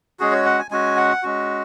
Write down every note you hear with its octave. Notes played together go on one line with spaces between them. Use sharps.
G#3 C#4 F#4 G#4
C#5
F#5
G#5
G#3 C#4 F#4 G#5
F#5
G#3 C#4 F#4